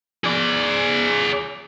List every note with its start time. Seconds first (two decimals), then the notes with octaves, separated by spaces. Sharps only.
0.24 G#4 D5